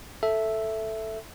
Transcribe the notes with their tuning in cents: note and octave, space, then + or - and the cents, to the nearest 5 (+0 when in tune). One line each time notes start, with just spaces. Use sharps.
A4 +0 E5 +0